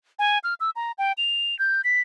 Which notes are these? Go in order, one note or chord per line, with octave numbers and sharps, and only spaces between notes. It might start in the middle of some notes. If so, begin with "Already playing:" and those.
G#5
F6
E6
A#5
G5
F7
G6
B6